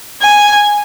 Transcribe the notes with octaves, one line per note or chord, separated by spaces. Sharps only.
G#5